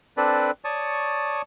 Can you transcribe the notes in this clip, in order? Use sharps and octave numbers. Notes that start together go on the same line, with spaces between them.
C4 D4 A4 B4 D5
C#5 D5 A5 C#6 D#6